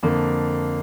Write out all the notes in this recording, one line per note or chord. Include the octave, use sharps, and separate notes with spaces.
F2 D3 A#3